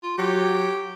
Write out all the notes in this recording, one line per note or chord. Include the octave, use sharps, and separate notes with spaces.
F4
F#3 G4